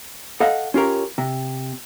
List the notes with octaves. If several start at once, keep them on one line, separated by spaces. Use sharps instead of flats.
A4 D#5 F5 F#5
C#4 F4 G4 A#4 C#5
C3